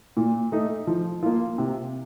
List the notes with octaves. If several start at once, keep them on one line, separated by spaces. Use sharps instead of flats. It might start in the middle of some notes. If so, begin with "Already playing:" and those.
A#2
A3 D#4
F3
A#3 F4
C3